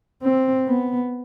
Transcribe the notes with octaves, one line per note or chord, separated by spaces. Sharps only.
C4
B3